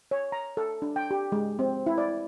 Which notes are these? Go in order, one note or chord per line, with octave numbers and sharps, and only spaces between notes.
C#5
A#5
A4
D4
G5
G4
G#3
C4
E4
D5